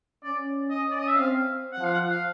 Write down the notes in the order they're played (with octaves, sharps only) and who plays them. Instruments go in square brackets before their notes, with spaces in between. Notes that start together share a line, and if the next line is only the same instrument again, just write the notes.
[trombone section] C#4 [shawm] D5
[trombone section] C#4 [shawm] D#5
[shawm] D5
D#5
E5
[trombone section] C4 [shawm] F5
[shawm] F#5
[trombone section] F3
[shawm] F5
F#5
F5